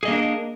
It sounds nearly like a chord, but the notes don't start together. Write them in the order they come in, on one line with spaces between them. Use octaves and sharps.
G#4 D#5 A#3 D4 A#4